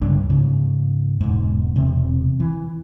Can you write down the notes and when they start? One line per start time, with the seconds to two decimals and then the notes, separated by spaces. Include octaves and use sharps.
0.01 C#2 G2 D3 D4
0.30 G#2 C#3
1.21 E1 G#2
1.76 E1 C3
2.40 E3